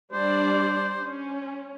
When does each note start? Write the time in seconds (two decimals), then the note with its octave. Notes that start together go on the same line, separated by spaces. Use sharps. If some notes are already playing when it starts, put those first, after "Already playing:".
0.13 G3 D4 C5 D5
1.01 C#4